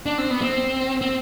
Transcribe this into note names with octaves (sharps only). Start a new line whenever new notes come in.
D4
C4
B3
C4
C4